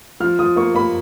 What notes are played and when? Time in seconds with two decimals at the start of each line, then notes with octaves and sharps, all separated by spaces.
0.20 F3 F6
0.39 F3 D#6
0.56 A#3 C#6
0.75 A#3 B5